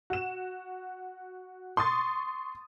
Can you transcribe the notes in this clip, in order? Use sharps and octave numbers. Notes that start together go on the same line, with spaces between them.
F#4 E7
C6 C#6 D#6 A6